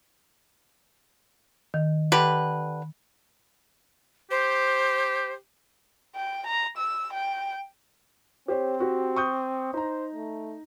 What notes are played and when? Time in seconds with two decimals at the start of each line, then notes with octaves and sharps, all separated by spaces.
1.74 D#3
2.12 D3 G4 B4
4.31 G4 C5
6.15 G5
6.47 A#5
6.78 E6
7.13 G5
8.48 C4 G4 C5 C#5
8.80 F#4 G4
9.16 C#6 D#6 G6
9.74 D#4 C5 A#5
10.15 A3